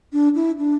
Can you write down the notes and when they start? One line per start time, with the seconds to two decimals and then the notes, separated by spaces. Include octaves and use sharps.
0.13 D4
0.35 E4
0.59 D4